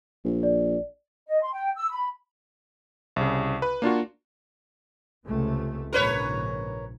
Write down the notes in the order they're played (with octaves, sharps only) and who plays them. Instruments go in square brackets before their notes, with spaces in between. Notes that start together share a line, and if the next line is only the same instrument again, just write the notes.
[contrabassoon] A#1
[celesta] D5
[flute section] D#5
C6
G5
E6
B5
[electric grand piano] C2 C#3
B4
A#3 D4 F4 F#4
[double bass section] C#2 C3 A3
[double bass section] A#1 G#2 C#3 [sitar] A#4 B4 C#5